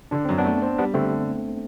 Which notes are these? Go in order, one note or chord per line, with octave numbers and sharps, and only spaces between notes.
D3 D4
F#2 C4
B3 D4
A3
C4
G3 B3 D4
D3 A3 C4